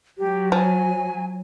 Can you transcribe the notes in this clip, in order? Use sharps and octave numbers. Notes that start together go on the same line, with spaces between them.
F#3 G4
F3 G#5